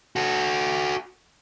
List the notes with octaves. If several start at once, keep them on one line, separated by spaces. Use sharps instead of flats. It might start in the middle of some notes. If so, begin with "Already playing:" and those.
F#4 A4